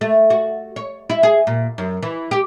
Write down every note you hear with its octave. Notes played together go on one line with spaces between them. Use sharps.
A3
F#4
C#5
E4
G#4
A#2
F#2
E3
G4